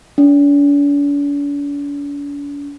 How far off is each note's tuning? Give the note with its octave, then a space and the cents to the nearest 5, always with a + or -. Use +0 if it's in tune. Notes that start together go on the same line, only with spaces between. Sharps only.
D4 -45